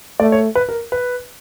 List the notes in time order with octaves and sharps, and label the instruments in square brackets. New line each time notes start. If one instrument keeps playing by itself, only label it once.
[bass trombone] A3 [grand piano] D5
[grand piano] C#5
B4
A#4
B4